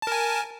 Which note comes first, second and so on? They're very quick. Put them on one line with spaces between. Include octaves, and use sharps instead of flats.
A5 A#4 G#5